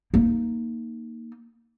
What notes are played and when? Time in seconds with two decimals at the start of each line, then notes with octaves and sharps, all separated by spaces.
0.14 A#3 D#4